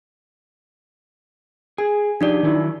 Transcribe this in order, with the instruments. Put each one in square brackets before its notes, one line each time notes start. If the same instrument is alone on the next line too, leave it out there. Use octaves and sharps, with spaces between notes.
[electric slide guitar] G#4 [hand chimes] G#5
[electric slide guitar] F3 G4 [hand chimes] D4 D#4 D5
[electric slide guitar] D#3 F#3 E4